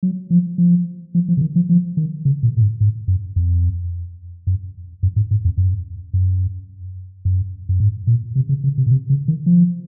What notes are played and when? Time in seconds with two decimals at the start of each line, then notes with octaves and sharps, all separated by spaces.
0.03 F#3
0.30 F3
0.58 F3
1.15 F3
1.28 F3
1.37 C#3
1.41 D#3
1.56 F3
1.69 F3
1.97 D#3
2.25 C#3
2.43 A#2
2.57 A#2
2.61 G#2
2.81 G#2
3.08 F#2
3.36 F2
4.47 F#2
5.03 F#2
5.16 G#2
5.31 G#2
5.45 F2
5.57 F#2
6.14 F#2
7.25 F#2
7.69 F#2
7.80 G#2
8.07 A#2
8.36 C3
8.49 C#3
8.64 C#3
8.78 C3
8.86 A#2
8.91 C3
9.10 C#3
9.28 D#3
9.46 F3